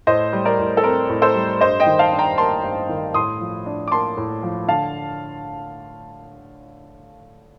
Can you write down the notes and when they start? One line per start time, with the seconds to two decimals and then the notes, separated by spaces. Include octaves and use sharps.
0.07 A2 C5 D#5
0.33 G3
0.45 A#4 D5
0.59 A2
0.77 A4
0.83 C4 A#4
1.09 A2
1.22 A4 C5
1.35 G3
1.61 G2 C5 D#5
1.80 D#5 G5
1.86 D#3
1.99 F5 A5
2.12 D4
2.19 G5 A#5
2.38 A#3 A5 C6
2.63 G2
2.89 D#3
3.14 A2 C6 D#6
3.40 F3
3.66 D4
3.88 D6
3.91 A#3 A5 C6
4.17 A2
4.43 F3
4.68 D3 F5 A5